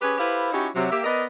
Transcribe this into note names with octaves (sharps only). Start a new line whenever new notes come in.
C#4 G4 G#4 B4
E4 G4 A4 B4 C5 F5
C#4 D#4 E4 F#4 G4
C3 F#3
A#3 G4 E5
B3 A#4 B4 D5 D#5